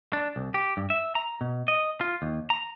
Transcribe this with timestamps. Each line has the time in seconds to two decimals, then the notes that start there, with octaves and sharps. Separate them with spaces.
0.13 D4
0.36 C2
0.54 G4
0.77 G2
0.90 E5
1.15 A#5
1.41 B2
1.68 D#5
2.01 F4
2.22 D#2
2.50 A#5